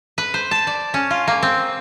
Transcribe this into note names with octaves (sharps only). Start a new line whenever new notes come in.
B4
C5
A5
D5
C#4
F4
A#3
C4